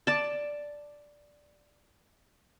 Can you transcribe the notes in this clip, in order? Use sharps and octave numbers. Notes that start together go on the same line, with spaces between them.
D5 A5